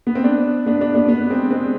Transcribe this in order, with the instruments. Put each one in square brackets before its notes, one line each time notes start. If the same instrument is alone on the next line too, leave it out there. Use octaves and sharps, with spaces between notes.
[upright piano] B3
C4
B3 D4
B3 D4
B3 D4
B3 D4
B3 D4
G#3 C4
G#3 C4